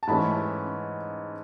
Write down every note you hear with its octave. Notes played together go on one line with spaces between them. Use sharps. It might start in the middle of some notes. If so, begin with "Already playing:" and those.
A5
G#2 E3 A3 C#4 B5